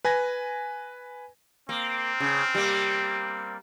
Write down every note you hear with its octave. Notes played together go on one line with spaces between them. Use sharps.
B4 G#5 G#6 A#6
A#3 C4
C#3
G3 A#3